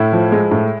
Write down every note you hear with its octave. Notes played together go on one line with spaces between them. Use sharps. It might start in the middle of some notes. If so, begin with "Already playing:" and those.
Already playing: A2 E4
F3
G#3
A2